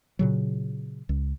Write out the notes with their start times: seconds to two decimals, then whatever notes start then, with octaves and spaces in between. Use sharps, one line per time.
0.19 A#2 C#3 F#3
1.09 C#2